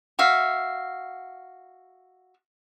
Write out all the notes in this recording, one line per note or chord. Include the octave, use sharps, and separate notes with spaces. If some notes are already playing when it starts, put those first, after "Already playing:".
F#4 E5 F5